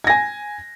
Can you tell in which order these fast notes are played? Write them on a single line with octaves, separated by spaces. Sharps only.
G#6 A#6 G#5